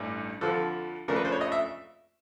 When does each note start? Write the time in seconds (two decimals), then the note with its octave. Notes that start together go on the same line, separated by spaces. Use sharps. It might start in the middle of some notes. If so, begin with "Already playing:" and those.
Already playing: A1 G2 E3 G3
0.41 F2 D3 F3 A4
1.08 F2 C#3 F3 A3 D4 A#4
1.16 B4
1.25 C5
1.32 C#5
1.41 D#5
1.52 E5